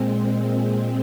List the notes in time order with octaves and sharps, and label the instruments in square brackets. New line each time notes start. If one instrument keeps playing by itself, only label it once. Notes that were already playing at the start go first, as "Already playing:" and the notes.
Already playing: [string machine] A#2 G#3 C4